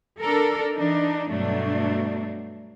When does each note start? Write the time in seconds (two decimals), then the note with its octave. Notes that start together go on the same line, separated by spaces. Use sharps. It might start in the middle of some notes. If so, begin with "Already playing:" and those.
0.20 D4 A4 A#4
0.75 E3 D4 D#4
1.29 G2 B2 F#3 A3 D4